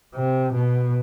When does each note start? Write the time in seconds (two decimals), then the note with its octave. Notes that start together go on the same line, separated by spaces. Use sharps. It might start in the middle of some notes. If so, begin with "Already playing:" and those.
0.15 C3
0.53 B2